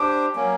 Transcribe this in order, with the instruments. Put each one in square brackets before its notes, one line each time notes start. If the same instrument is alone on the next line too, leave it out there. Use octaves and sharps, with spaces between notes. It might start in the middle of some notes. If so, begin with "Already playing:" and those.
Already playing: [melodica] D4 G4 C5 [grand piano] D6
[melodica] F#3 A#3 C#4